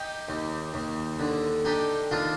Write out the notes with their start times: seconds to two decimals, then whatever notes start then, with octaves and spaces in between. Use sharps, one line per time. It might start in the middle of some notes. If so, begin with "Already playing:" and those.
Already playing: D#4 G4
0.29 D#2
0.74 D#2
1.19 D3
1.65 D4 D#4 G4
2.11 D#2 D4 F4